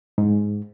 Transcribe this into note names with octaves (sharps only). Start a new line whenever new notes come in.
G#2